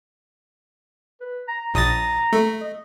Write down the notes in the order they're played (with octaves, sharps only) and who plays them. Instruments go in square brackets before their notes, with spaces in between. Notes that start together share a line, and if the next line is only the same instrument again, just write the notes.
[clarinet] B4
A#5
[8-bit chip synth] A#1 D#6 A6 [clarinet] A#5
[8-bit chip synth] A3
[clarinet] D#5